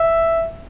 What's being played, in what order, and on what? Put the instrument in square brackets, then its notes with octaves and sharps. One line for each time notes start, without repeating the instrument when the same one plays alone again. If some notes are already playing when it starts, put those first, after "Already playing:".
Already playing: [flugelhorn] E5